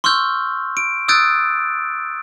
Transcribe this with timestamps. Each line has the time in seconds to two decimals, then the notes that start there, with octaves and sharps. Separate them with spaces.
0.04 C6 C#6 E6 F6 G6
0.77 D7
1.08 D#6 E6 F#6 G6 A6 D7